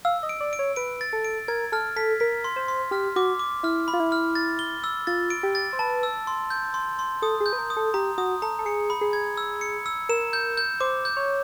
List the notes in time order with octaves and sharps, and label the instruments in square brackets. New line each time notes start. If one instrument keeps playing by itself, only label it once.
[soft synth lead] F5 [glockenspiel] E6
[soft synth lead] D#5
[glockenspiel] D7
[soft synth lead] D5
[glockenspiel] D7
[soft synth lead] C#5
[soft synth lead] B4 [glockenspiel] D7
[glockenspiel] A6
[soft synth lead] A4
[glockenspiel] D7
[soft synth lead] A#4 [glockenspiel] G#6
[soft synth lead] A4 [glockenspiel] F6
[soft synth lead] A4 [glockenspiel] B6
[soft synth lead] A#4 [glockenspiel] B6
[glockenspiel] C6
[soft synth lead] C5
[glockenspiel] C6
[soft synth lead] G4 [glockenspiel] F6
[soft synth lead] F#4 [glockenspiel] D6
[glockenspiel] D6
[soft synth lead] E4 [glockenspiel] F6
[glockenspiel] B5
[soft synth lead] F4
E4
[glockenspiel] F6
A6
G7
E6
[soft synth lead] F4 [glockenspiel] A6
[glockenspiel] D7
[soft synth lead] G4
[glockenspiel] A6
[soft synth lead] C5
[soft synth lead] B4 [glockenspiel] A5
[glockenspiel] E6
C6
G6
C6
C6
[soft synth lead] A4 [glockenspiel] D#6
[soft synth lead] G#4
[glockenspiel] G6
[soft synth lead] B4
A#4
[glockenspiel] D#6
[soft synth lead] A4
[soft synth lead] G4 [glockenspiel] A#5
[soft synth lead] F#4 [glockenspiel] D#6
[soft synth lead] A4 [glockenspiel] A#5
[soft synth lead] A4
[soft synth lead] G#4 [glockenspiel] C#7
[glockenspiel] B5
[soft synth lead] G#4
[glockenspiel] G#6
E6
C#7
E6
[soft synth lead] A#4 [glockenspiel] E7
[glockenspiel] G6
G6
[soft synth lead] C5 [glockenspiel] D6
[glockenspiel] G6
[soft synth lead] C#5